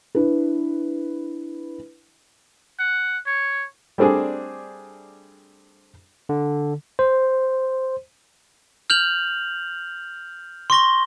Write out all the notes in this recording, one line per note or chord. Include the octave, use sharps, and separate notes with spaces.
D4 E4 B4
F#5
C#5
G3 A3 C4 D4 G#4
D3
C5
F6 G6 F7 F#7
C6 C#6 A#6 G7